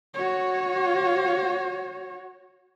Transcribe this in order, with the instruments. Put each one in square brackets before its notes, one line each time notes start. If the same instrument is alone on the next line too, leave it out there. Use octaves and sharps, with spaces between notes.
[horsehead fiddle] F#4 C#5